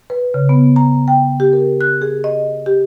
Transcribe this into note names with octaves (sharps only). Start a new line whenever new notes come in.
B4
C#3
B3
A#5
G5
G4
A#4
F#6
G#4
D#5
G4